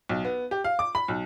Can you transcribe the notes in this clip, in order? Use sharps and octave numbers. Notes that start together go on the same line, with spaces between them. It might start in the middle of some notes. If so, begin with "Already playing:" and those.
B1
B3
G4
F5
D6
B5
B1